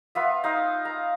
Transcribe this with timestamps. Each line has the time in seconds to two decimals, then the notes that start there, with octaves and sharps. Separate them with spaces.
0.15 B3 F4 E5
0.44 D#4 F5
0.85 A#5